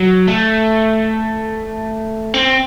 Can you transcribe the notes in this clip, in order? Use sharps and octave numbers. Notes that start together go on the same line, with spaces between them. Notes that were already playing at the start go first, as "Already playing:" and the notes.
Already playing: F#3
A3
C4